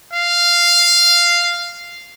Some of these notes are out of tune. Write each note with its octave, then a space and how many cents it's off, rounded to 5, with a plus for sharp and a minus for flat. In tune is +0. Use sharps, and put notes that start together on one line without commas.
F5 -5